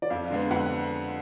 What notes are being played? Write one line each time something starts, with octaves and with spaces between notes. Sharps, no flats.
D5
F2 F5
D3 G#3 B3
F2 F#5